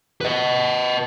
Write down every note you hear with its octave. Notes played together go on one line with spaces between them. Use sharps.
B4 D#5